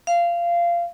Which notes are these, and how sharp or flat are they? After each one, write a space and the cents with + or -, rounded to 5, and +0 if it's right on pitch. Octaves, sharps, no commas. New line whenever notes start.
F5 -20